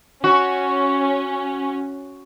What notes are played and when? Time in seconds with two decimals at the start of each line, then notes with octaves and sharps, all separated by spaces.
0.24 C#4 F#4